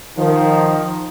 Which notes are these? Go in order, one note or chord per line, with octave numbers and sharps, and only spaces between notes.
D#3 F3